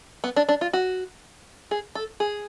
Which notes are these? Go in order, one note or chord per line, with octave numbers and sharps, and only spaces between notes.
B3
D4
D4
F4
F#4
G#4
A4
G#4